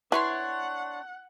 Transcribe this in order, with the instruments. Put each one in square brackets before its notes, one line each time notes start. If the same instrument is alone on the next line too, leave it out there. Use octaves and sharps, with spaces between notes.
[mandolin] D4 C#5 C6 [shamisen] E4 B4 [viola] F#5